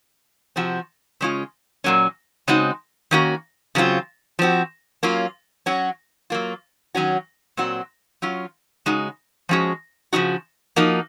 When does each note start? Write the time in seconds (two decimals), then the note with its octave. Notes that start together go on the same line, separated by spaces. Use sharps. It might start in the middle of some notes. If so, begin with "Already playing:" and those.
0.56 C3 F3 C4 F#4
1.21 C#3 G#3 C#4 F4
1.84 A#2 F#3 A#3 C#4
2.48 C#3 G#3 C4 D#4 F#4
3.11 D#3 A#3 C#4 F#4
3.75 C#3 F#3 C4 F4
4.39 F3 C4 F#4
5.03 F#3 A#3 C#4 F4
5.66 F#3 C#4 F#4
6.30 F#3 A#3 F4
6.95 D#3 F#3 C#4 F#4
7.57 A#2 F#3 C4 F#4
8.22 F#3 C#4 F4
8.86 C#3 G#3 D#4 F#4
9.49 F3 G#3 C#4 F#4
10.13 C#3 F3 G#3 D#4 F#4
10.76 F3 A#3 D#4 F#4